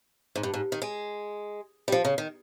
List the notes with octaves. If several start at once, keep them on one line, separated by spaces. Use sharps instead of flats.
G#2
G2
G#2
D#3
G#3
G3
F3
C#3
D#3